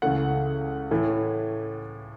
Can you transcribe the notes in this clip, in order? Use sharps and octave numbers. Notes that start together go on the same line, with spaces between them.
C#2 C#3 E3 A3 F#5
A2 E3 A3